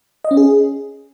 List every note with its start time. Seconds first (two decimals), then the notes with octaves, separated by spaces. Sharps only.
0.25 D#5
0.31 C#4
0.37 G#4